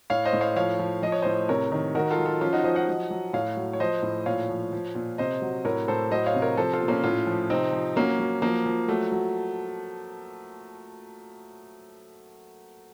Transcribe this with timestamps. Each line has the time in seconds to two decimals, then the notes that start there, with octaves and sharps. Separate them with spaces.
0.10 A2 C#5 F5
0.25 C5 D#5
0.33 A2
0.41 C#5 F5
0.56 F3 C#5 F5
0.79 F3
1.02 F3 D#5
1.12 C#5
1.22 A2 C5 D#5
1.49 C3 A#4 C#5
1.72 D#3
1.95 D#3 F#4 A#4
2.10 F4 A4
2.18 F#3
2.25 F4 A4
2.41 F3 C#4 F4
2.52 D#4 F#4
2.64 F3 C5 D#5
2.75 D#5 F#5
2.88 F#3
3.10 F#3
3.33 A2 C#5 F5
3.57 F#3
3.73 C#5
3.80 F3 C5 D#5
4.03 A2
4.26 A#2 C#5 F5
4.49 F3
4.72 F3
4.95 A#2
5.18 C3 C5 D#5
5.42 F#3
5.65 A2 A#4 C#5
5.88 A2 A4 C5
6.11 F#3 C5 D#5
6.26 C#5 F5
6.35 C3
6.42 A#4 C#5
6.57 F3 A4 C5
6.73 F4 A4
6.81 A#2
6.88 A#3 C#4
7.03 A2 C#4 F4
7.27 F3
7.50 C3 C4 D#4
7.72 F3
7.96 F#3 A#3 C#4
8.19 F#3
8.42 F3 A#3
8.66 F3
8.88 F#3 A3
9.12 F#3